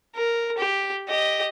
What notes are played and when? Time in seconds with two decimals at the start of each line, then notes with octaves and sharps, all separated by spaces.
0.16 A#4
0.58 G4
1.08 G4 D#5